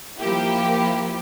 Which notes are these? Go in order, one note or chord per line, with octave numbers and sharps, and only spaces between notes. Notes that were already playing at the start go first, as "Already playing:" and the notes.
F3 A#3 E4 G4